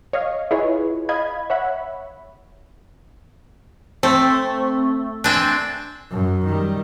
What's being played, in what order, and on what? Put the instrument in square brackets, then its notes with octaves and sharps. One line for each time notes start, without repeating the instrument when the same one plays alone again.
[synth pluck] C#5 D#5 F5
E4 F4 G#4 B4 C#5 D#5
D#5 F5 B5 G#6
C#5 E5 F#5 B5
[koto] A3 [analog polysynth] C4
[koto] C4 D4 [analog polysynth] G#5 F#6
[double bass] F#2
D#3 G3